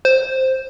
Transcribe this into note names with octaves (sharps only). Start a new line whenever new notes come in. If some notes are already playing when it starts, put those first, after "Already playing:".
C5